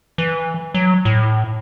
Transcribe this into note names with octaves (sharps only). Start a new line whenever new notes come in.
E3
F#3
A2